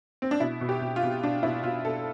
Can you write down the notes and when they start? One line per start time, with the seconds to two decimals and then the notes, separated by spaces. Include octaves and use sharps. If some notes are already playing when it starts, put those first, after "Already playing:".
0.22 C4
0.31 D4
0.40 B2 E4
0.61 B2
0.69 G4
0.81 B2
0.96 F4
1.03 B2
1.23 B2 D4
1.43 B2 E4
1.63 B2 F4
1.85 B2 A4